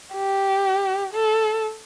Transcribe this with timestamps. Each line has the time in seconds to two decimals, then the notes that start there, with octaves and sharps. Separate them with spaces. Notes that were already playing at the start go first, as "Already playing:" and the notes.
0.14 G4
1.14 A4